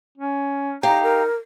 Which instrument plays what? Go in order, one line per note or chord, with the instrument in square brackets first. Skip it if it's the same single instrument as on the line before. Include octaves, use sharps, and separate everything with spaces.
[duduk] C#4
[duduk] D#4 [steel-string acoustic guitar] G4 F5 [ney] A#5
[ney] A#4